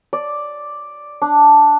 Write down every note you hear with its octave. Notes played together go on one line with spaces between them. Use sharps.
D5
D4